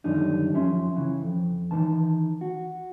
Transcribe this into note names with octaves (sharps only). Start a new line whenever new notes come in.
F#2 D3 D#3 G3 D#4
F#2 F3 C#4 E5 C6
C#3 E3
F2
D#3 E3 A5
F#4